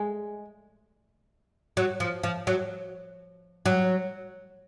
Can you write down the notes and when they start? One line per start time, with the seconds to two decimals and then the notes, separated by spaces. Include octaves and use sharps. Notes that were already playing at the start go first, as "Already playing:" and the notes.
Already playing: G#3
1.77 F#3
2.00 F3
2.23 F3
2.47 F#3
3.66 F#3